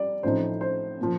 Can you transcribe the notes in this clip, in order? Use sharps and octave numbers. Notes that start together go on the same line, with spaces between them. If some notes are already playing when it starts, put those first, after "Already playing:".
Already playing: G3 D5
A1 A2 F3 C4 D#4 C5
C5
A#2 F3